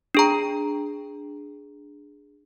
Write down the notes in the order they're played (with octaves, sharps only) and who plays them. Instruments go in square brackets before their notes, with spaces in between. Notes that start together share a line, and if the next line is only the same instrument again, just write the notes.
[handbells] D4 G#4 A#5